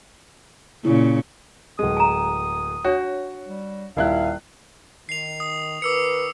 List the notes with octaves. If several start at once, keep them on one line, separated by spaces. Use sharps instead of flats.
A#2 C#3 E4
D1 G#3 D#6
G#5 A#5
D4 F#4 C#5
G3
D#1 E4 F5 F#6
D#3 C7 F7
D#6
D#3 A#4 B4 D6 E6 C#7